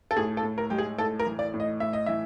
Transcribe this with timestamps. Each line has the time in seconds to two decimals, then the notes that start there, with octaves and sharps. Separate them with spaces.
0.11 A4
0.17 A2 G#4
0.37 A4
0.43 A2
0.58 A#4
0.70 G#3 G4
0.78 G#4
0.98 A2 A4
1.20 A#4
1.26 E3
1.39 D5
1.54 A2
1.60 D#5
1.80 A2 E5
1.93 D#5
2.06 E3 E5